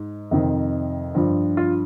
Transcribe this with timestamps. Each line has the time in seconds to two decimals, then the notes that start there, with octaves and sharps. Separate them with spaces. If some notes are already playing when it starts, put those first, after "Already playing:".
Already playing: G#2
0.31 F2 C3 D#3
1.15 G2 F3
1.57 F4